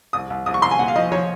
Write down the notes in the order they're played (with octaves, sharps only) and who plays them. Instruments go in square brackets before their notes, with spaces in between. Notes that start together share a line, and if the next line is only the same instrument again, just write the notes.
[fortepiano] C2 D#6
C2
C2 D#6
C#6
C2 C6
G#5
A#2 F#5
F5
F3 D#5
F3 C#5